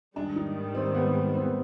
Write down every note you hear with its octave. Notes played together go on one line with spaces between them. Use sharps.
G#2 D#3 G3 D4
D#4
C4
B3
C4
B3